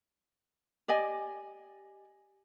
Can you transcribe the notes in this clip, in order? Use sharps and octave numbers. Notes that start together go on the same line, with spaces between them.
G4 D5 D#5 G#5